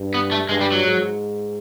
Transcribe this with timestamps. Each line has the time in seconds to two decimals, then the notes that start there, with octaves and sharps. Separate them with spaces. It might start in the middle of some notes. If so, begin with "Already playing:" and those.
Already playing: G2
0.14 B3
0.32 A3
0.49 G2 G#3
0.61 G3
0.72 F#3
0.84 G#2